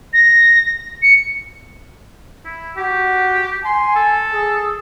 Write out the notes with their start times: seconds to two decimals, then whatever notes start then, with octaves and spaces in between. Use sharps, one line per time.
0.13 A#6
1.02 C#7
2.45 E4
2.77 F#4 G4
3.65 G#5 C6
3.96 A4
4.33 G#4